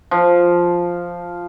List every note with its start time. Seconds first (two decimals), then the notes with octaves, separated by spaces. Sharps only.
0.11 F3